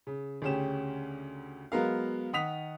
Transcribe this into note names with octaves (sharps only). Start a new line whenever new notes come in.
C#3
D2 C#3 C#4 G4 E7
F#3 G#3 B3 A#4 F5
D#3 F#5 D#6 B6 F7